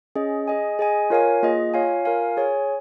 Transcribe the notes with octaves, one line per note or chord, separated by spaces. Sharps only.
C#4 G#4 D#5
G#4 D#5 G#5
G#4 D#5 G#5
F4 A#4 C#5 F5 G#5
A#3 F4 G#4 D#5
F4 C#5 F5 G#5
F4 A#4 F5 G#5
G#4 C#5 G#5